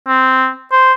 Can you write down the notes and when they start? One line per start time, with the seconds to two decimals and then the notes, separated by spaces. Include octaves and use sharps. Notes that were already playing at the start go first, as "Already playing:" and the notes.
0.07 C4
0.72 C5